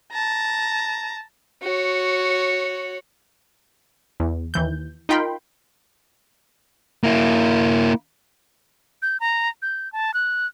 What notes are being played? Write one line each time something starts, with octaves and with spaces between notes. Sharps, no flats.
A5 A#5
F#4 C#5
E2
D#2 E3 G6
D#4 F4 A#4 G5 B5 C6
A#3 E4
G6
A#5
G6
A5
F#6